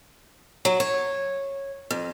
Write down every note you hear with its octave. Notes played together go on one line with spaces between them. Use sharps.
F#3
C#5
F2